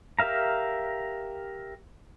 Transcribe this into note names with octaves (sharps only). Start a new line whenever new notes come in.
G4 A#4 E5 F5 A#5